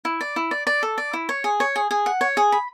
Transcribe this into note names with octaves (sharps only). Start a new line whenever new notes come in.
E4
D5
E4
D5
D5
A4
D5
E4
C#5
G#4
C#5
G#4
G#4
F#5
C#5
G#4
B5